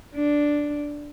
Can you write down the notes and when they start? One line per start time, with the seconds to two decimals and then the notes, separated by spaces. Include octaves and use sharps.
0.15 D4